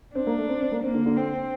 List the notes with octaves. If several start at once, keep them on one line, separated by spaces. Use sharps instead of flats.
C4 D4
A#3
A3
C4
C4
A#3
A#3 C4
D3
D3
C4